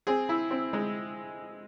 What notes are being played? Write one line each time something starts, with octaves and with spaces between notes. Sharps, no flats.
C4 G#4
E4
C4
G#3